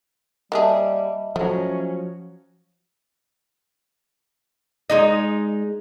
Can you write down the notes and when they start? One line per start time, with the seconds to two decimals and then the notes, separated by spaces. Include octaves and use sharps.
0.52 G3 A#3 G4 G#4 D#5 E5 A5
1.36 F3 F#3 A3 C#4
4.90 G#3 D#4 D#5